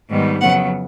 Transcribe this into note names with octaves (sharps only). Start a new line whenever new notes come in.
G#2 D#3 G3 B3
F2 C#3 F#3 B3 F#5